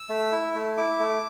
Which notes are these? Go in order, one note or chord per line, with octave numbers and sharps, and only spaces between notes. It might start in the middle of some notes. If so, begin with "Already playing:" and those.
Already playing: E6
A3
E4
A3
E4 D6
A3